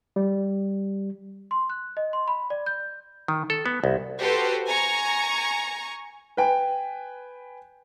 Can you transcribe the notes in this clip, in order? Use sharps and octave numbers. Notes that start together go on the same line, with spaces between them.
G3
C6
F#6
D#5
C6
B5
D5
G6
D#3
A4
B3
C2
F#4 G4 A4 B4 C5
G#5 A#5 C#6
B4 G5 G#5